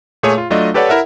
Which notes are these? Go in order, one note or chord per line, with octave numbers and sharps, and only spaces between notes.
A#2 A3 G#4 C#5
F4
F#3 A3 D4 F4 D#5
G4 A4 B4 C#5 D5 F#5
E4 A#4 E5 F#5